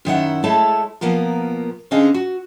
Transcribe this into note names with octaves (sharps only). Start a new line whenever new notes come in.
F#2 D#3 E4 F#5
G#3 A3 E4 A4 C#5 A5
B2 F3 A#3 B3 A#4
D3 C4 C#4 G#4 D#5 F5
F#4